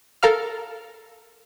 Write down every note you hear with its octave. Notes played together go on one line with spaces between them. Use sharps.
A4 A#4 F5 F6